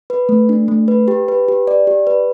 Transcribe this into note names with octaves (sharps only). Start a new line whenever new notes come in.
B4
A3
D4
A3
B4
G4
B4
G4
D5
G4
B4